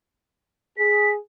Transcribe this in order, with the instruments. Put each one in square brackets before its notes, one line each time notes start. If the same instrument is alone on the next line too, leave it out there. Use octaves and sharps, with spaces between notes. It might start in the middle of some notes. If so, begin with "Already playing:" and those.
[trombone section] G#4 [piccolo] B6